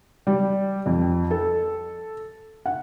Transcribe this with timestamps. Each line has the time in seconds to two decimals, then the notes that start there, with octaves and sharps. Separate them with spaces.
0.27 G3
0.86 F2
1.31 A4
2.66 F#5